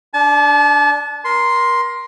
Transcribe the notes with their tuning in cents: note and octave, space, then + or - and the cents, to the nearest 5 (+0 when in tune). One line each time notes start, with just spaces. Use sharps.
D4 +0 A5 -35
A#4 +25 C6 +0